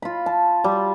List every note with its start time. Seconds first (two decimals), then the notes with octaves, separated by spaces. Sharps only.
0.02 F4 B5
0.26 A5
0.64 G3